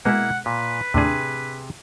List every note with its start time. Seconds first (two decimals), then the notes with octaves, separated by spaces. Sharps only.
0.05 B2 G#3 A#3 E4 F#5
0.46 A#2 B4
0.94 D#2 A2 C3 D4 G#4